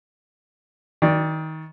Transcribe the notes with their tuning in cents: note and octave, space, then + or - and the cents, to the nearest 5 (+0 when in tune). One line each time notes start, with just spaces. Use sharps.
D#3 +25 D5 +10